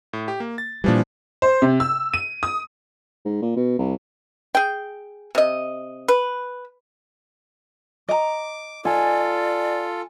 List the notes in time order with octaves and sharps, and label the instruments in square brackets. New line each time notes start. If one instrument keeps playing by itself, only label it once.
[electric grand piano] A2
G4
A#3
A6
[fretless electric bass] A#2 G3 [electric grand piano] E3 F3 D4
[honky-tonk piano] C5
C3
E6
D#7
D#6
[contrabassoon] G#2
A#2
B2
C2
[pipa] G#4 G5
C3 D#5
B4
[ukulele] D#5 A#5 [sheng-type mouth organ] D6
[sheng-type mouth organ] F4 A4 [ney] D5 [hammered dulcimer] G#5